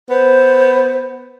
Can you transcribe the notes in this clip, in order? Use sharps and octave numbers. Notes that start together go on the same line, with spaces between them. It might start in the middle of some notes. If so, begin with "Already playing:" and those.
B3 C5